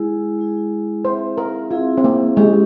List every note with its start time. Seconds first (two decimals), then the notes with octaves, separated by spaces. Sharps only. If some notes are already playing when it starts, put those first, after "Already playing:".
Already playing: G#3 E4 G#4
0.39 G#3 E4 G#4
1.05 C4 E4 G#4 C5 E5
1.38 A#4
1.71 C4 E4 F4 G#4 E5
1.97 C4
2.04 A#3
2.36 G#3 C#4 E4 G4 C5